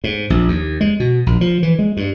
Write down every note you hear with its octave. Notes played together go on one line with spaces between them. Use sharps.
G#2
A#1
D#2
G#3
B2
A#1
F3
E3
G#3
G2